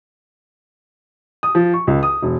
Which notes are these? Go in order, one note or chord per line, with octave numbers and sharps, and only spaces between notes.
D#6
F3
C#6
C#2
D#6
E1